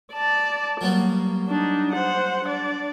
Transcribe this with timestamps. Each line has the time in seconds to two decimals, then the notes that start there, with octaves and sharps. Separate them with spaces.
0.13 D5 A5
0.81 F#3 G3 A#3 B3
1.48 D4 D#4
1.93 C5 F#5
2.45 D4 D5